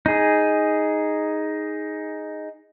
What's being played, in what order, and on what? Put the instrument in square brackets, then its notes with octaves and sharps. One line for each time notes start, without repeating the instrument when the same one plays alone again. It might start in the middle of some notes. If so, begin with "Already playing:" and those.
[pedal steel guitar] D#4 G#4